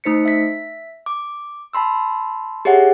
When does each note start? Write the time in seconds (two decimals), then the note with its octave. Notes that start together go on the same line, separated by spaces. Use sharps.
0.04 A3 D#4 C5 B6 C#7
0.25 E5 B6
1.06 D6
1.73 A5 B5 C6 E6
2.65 G4 G#4 C#5 E5 F#5